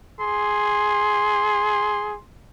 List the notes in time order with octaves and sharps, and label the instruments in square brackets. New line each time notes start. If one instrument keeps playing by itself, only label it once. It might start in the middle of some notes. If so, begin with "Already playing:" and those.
[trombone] G#4 [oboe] C6